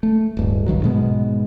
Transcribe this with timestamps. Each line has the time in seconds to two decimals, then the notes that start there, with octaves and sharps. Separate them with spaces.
0.03 A3
0.37 D1 G2
0.66 B1 G2 D#3 F#3
0.82 G#2 B2 G#3 B3